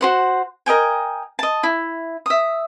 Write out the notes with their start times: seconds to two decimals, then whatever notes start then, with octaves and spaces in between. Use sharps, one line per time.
0.01 F#4 C5 F#5
0.66 A#4 D#5 G5 G#5
1.39 D#5 A5
1.63 E4
2.26 E5 D#6